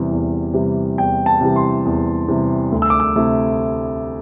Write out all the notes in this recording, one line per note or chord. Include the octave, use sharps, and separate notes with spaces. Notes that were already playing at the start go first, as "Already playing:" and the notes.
Already playing: E2 C3 E3 G3
E2
C3 E3 G3
E2 G5
A5
C3 E3 G3
C6
E2
C3 E3 G3
D2
E6
D6
E6
C3 A3 E4